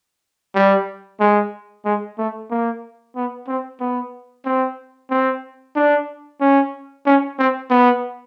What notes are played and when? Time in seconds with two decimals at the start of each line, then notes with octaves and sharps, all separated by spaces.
0.55 G3
1.20 G#3
1.85 G#3
2.18 A3
2.50 A#3
3.16 B3
3.48 C4
3.80 B3
4.46 C4
5.10 C4
5.76 D4
6.41 C#4
7.06 C#4
7.38 C4
7.70 B3